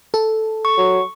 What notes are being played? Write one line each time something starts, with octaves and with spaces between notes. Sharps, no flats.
A4
C#6
F#3